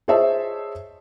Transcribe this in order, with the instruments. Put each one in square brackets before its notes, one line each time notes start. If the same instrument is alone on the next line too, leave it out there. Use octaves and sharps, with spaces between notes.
[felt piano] G#4 C5 C#5 D#5 E5 A5